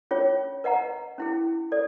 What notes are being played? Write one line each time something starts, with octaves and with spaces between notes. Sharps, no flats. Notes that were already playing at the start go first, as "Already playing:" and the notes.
C#4 F4 G#4 C#5
B4 D#5 F#5 A#5
C#4 E4 G#4
A4 D5